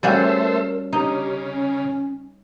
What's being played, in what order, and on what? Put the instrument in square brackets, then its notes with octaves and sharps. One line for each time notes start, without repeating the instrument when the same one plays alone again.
[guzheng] G3 C#4 F#4 [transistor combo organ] A3 C5 E5 [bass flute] A#4
[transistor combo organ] C#3 [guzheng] D#4 [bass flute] G4
[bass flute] C#4